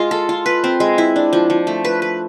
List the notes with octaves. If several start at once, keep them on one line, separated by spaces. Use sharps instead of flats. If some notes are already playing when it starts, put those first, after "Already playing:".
Already playing: G#3 F4
A4
F4
B4
C4
G#3
E4
D4
F3
F3
A3
B4
B4